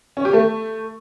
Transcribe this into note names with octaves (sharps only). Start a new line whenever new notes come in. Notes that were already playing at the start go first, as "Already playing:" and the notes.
C#4
G4
A3